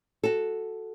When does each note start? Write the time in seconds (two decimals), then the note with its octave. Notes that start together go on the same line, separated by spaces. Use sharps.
0.24 F#4 A4